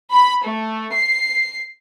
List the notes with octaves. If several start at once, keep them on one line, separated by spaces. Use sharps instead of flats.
B5
A3
C7